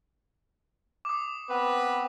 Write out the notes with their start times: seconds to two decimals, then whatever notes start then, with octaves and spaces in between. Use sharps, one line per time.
1.05 D6 D#6
1.49 B3 C4 B4